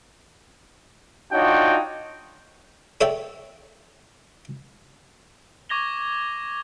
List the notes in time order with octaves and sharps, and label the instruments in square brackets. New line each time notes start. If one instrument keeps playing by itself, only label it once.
[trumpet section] D4 D#4 F4 F#4 C#5 G5
[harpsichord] A4 C#5 D5 E5 G5
[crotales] C#6 D6 G#6 A#6 F7 G7